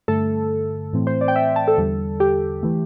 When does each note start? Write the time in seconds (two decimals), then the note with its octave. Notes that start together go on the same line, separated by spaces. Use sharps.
0.08 G2 D3 A3 A4
0.93 A2 E3 A3 C4
1.07 C5
1.21 D5
1.28 G5
1.36 E5
1.56 A5
1.68 A4
1.78 E2 D3 G3
2.20 G4
2.63 E3 A3